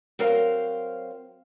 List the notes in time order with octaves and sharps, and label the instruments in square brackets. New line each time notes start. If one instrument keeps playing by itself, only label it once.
[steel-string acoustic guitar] F#3 C4 A#4 C5 F5